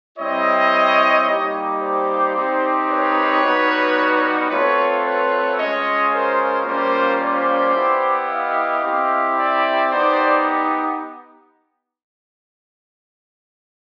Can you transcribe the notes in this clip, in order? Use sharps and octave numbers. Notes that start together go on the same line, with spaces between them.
G3 C4 E4 C#5 D#5
G3 A#3 D#4 G4
C5 D5
C4 D#4 G4
B4 C#5
G3 B3 D#4 F#4
A3 C4 F4 B4 C#5
B4 C#5
G#3 C#4 F4 C#5 D#5
A#4 C5
G3 A#3 C#4 F4 A#4 C5
C5 D5
B3 E4 G4
D#5 F5
C4 E4 G4
D5 E5
B3 D#4 G4 C5 D5